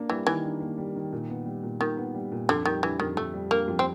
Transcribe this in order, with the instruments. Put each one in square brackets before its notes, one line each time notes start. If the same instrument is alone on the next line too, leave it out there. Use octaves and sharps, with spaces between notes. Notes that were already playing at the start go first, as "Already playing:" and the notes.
Already playing: [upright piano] A#3 D4
[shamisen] E3 [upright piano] G3
[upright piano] D#3 [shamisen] E3
[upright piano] D4
A#3
G3
D#3
A#2
B3
G3
A#2
[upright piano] A#2 [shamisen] D#3
[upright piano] B3
G3
A#2
[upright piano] F2 [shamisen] D3
[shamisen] D#3 [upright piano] G3
[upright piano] D3 [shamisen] E3
[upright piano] F2 [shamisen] D#3
[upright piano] F2 [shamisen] A3
[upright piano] G3
[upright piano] D3 [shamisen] A#3
[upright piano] F2
[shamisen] C4